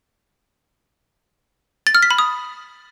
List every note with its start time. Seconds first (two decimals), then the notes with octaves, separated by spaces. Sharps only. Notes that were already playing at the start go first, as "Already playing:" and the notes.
1.87 A6
1.95 F6
2.03 B6
2.11 B5
2.19 D#6